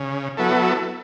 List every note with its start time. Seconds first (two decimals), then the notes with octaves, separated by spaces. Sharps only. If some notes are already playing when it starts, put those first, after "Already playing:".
Already playing: C#3
0.37 F#3 B3 E4 A4